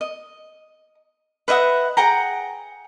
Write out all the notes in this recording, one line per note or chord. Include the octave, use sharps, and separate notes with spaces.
D#5
B4 D#5 E5 F#5
G#4 F#5 G5 A#5